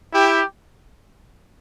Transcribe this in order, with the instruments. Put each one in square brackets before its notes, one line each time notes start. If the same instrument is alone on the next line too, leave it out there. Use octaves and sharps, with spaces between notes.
[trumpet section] E4 G4